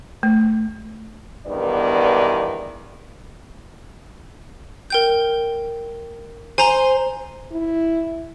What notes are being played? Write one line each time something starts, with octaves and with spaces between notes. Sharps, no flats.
A3
E2 G2 D#3 B3 D5
A#4 G5 G6
C5 G#5 A#5
E4